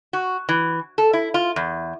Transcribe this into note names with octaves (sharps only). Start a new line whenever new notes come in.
F#4
E3
A4
E4
F4
E2